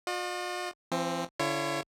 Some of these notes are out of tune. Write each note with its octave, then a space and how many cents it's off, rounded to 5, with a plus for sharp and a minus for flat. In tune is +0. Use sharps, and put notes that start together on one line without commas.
F4 +45 D#5 -45
F3 -45 C4 +10
D3 -20 E4 +40 C#5 -10